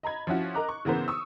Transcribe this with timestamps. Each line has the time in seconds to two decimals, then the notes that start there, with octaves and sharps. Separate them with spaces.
0.03 D#5 A#5 B5 G#6
0.27 F3 C#4 E4 F#4
0.54 A#4 D#5 A#5 D6 F#6
0.69 C#6
0.85 C#3 E3 B3 A#4 C5
1.08 C#6 D#6 E6